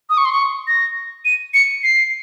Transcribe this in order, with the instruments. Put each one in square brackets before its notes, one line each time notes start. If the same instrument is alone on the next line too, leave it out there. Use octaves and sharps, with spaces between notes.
[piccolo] D#6
C#6
C6
C#6
A#6
D#7
C#7
C7